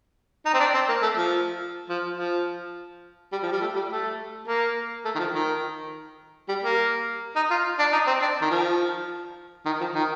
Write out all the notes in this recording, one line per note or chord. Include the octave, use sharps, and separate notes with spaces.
D#4
C4
D4
C4
A#3
A3
F3
F3
F3
G3
F3
G3
A3
G3
A3
A#3
A3
D#3
F3
D#3
G3
A#3
D#4
F4
D4
D#4
C4
D4
D#3
F3
D#3
F3
D#3